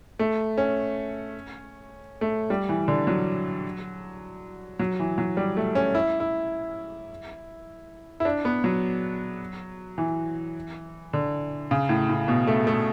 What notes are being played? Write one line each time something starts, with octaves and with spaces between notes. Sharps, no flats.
A3
C#4
A3
G3
E3
D3
F#3
F#3
E3
F#3
G3
A3
C#4
E4
E4
E4
D4
B3
F#3
E3
D3
C#3
A2
A2
B2
A3
A3